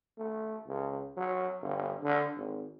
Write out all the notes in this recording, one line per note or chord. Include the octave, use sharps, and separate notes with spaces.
A3
C#2
F#3
G1
D3
G#1